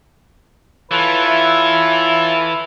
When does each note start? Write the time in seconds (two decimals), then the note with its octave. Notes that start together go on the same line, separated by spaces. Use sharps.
0.91 E3 F4 A4 B4 C#5
1.25 E4